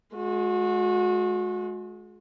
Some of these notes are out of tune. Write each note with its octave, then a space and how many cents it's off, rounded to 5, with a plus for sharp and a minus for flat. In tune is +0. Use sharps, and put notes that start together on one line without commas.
G#3 +30 F#4 -30